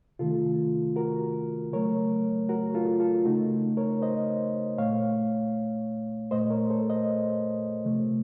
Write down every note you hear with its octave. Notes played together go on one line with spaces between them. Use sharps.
C3 D#3 A3 F4 A4
F#4 A#4
C#3 F#3 A3 A#4 C#5
F#4 A#4
F4 A4
F4 A4
C#3 A3 D#4 F#4
A#4 C#5
C5 D#5
A#2 A3 C#5 F5
A#2 A3 C5 D#5
A#4 C#5
A4 C5
C5 D#5
C3 F3 A3